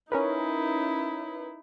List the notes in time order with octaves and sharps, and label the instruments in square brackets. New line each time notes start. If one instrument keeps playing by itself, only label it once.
[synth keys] C#4 A#4 B4 [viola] D#4 E4